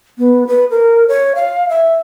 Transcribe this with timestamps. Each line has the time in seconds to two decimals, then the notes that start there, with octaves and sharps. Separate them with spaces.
0.18 B3
0.47 B4
0.70 A#4
1.08 C#5
1.35 F5
1.69 E5